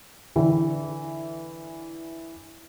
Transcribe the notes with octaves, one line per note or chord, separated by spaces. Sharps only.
D3 E3